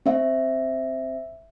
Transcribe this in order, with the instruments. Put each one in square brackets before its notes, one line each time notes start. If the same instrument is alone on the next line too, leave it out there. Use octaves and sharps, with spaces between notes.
[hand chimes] C4 E5